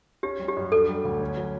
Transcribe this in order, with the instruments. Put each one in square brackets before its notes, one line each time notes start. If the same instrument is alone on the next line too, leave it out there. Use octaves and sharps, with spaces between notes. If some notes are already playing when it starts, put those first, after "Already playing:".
[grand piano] C#4 [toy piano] G4
[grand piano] G3
[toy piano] G4
[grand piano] F#2
[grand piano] D4 [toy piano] A4
[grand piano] G3
D2
C#4
F#3